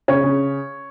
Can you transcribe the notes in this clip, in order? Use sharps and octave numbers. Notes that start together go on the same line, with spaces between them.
C#3 C#5
C#3